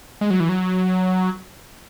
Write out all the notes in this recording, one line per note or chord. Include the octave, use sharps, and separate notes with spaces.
G#3
F#3
E3
F#3